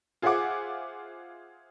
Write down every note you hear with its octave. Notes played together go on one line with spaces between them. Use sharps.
F4 G#4 C5 E5 F#5 D6